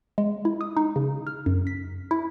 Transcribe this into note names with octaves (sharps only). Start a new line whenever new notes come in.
G#3
E4
D#6
D#4
C#3
F6
F#2
B6
E4